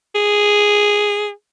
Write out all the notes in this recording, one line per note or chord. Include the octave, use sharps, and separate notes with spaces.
G#4